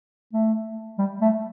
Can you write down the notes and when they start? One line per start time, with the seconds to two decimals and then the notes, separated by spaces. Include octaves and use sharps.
0.33 A3
0.98 G3
1.21 A3